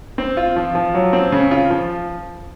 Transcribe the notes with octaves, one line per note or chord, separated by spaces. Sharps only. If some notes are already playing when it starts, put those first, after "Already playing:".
C4
F4
F3
F3
F#3
C4
C#3
F4
F3